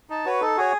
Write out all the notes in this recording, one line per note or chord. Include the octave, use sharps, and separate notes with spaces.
D#4 A5
F#4 B4 C#5
D#4 A4
F#4 G#4 C#5